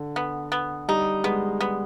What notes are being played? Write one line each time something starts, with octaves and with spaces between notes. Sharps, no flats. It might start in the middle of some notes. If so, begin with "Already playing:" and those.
Already playing: D3
B3
B3
G3 D#4
G#3 B3
B3